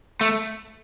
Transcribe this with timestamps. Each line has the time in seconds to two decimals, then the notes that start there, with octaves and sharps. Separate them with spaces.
0.21 A3